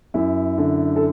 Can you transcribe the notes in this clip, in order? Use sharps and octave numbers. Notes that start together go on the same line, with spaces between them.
F#2 E4
D3
A4